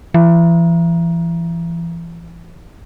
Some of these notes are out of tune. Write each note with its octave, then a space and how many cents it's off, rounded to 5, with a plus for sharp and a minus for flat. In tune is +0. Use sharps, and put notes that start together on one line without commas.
E3 +35